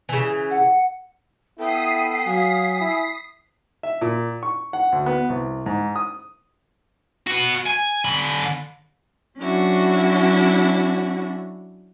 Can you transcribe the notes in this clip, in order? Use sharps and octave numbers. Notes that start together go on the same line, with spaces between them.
C#3 E3
F#5
B3 E4 A4 G5 D#6 B6 C7
F#3 F5 G#5
E4
E5
A#2
C#6
F#5
D2
B3
C2
G#2
D#6
F#4 B4
G#5
D3 B5
F#3 C#4 D4 E4 F#4